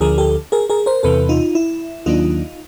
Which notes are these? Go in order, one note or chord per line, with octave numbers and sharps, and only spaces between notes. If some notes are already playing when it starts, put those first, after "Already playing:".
D2 D3 F3 G#4 A#4
G4 A4
G#4 A#4
G#4 A#4
A#4 C5
E2 C3 E3 A4 B4
D#4 F4
E4
D#2 D#3 F#3 A#3 D4 D#4 F4